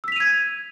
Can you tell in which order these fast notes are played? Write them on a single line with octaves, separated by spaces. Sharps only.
E6 B6 F7 D#7 G#6